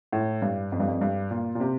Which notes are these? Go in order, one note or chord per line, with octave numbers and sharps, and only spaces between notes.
A2
G2
F2
G2
F2
G2
A#2
A#2
C3